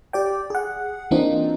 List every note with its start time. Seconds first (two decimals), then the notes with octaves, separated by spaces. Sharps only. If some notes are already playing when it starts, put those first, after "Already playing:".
0.13 G4 D5 G5
0.50 G#4 F#5
1.11 E3 A#3 C4 D4 D#4 F4